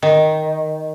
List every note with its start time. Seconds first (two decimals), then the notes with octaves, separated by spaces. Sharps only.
0.02 D#3